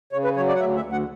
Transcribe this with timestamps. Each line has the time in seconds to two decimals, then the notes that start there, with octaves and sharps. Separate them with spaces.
0.12 C#3 C#5
0.24 B4
0.36 F#3 C#5
0.48 D5
0.56 F#5
0.60 D2 E5
0.76 E5
0.84 D2
0.92 F#5